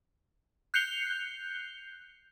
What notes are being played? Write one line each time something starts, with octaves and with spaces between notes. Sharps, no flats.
F#6 G6 C7 C#7 F7 G7